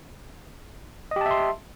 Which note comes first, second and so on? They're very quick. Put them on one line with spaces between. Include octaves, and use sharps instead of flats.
D#5 G4 A5 E5 C6